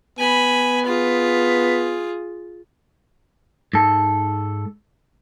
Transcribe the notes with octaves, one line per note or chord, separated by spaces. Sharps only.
B3 G#5 B5
F4 G#4
G#2 A4